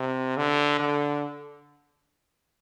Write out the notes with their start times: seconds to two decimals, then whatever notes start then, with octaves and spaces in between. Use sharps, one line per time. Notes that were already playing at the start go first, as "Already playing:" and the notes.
Already playing: C3
0.37 D3
0.79 D3